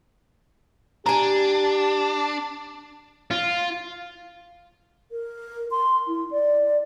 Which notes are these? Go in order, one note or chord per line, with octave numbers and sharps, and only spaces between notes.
D4 G4 G#5 A#5
F4
A#4
C6
E4
D5